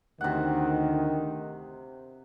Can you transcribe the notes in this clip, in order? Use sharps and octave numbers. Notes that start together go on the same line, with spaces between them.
D2 C3 D#3 F#5